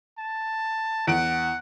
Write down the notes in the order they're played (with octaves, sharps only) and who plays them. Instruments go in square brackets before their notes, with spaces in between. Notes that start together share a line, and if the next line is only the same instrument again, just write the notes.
[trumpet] A5
[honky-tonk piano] E2 D7 [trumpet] F#5